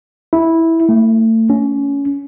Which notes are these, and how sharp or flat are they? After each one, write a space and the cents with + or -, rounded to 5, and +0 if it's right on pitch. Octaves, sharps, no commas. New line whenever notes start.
E4 -10
A3 +30
C#4 +20